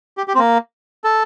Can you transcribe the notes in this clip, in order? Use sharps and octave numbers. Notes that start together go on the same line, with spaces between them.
G4
G4
C4
A#3
A4